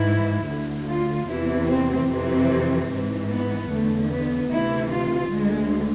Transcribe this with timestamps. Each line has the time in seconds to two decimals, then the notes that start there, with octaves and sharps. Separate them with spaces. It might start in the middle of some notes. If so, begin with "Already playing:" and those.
Already playing: G#2 E3 E4
0.47 D2 D3
0.87 F4
1.27 E2 C3 E3 E4
1.68 C4
2.08 F2 C3 E3 C4
2.89 G#2 E3
3.29 B3
3.69 E2 D3 A3
4.09 B3
4.50 D2 C3 E3 E4
4.90 F4
5.31 D2 D3 G#3